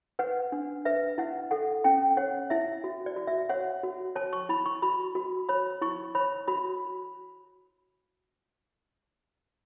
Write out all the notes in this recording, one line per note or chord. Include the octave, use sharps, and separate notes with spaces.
B4 F#5
D4
B4 E5
E4 F#5
A4 F#5
C#4 G5
C#5 F#5
E4 E5
F#4
D5
F#4
E5
C#5 F#5
F#4
C#5 A5
C#6
E4 B5
C#6
F#4 B5
F#4
C#5 B5
E4 C#6
C#5 B5
F#4 B5